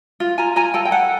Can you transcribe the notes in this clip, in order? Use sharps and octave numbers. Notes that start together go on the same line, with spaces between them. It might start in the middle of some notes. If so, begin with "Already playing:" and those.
F4
F4 G#5 A#5
F4 G#5 A#5
A4 G5 A5
G5
A4 F#5 G#5